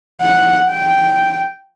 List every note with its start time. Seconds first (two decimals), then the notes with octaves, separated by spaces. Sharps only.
0.21 F#5
0.70 G5